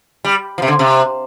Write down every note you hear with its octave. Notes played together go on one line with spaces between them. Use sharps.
G3
F3
C3
D3
C3